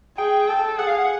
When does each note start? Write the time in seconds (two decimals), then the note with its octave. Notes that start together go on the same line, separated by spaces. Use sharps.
0.18 G#4 G5
0.49 A4
0.78 G#4 F#5
0.87 F5
0.98 F#5